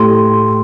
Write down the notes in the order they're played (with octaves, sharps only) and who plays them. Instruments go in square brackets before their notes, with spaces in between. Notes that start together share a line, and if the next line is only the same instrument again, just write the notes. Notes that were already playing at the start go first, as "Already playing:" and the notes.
Already playing: [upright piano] A2 A3 E4 G4 [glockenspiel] C6